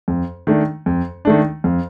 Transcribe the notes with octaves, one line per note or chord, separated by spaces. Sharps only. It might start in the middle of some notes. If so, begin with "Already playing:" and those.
F2
D#3 A3 D4
F2
D#3 A3 D4
F2